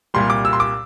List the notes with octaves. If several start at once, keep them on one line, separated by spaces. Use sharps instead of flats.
C2 A#2 G3 C6
D6
E6
C6
D6